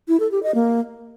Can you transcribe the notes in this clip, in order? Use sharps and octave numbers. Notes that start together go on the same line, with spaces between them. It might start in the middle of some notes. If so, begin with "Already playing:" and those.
E4
A4
G4
D#5
A#3